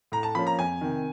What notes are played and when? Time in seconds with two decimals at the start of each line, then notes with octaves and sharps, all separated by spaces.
0.12 A2 A#5
0.23 A5
0.35 F3 A#3 C#4 B5
0.47 A#5
0.58 F2 G#5
0.81 C3 D#3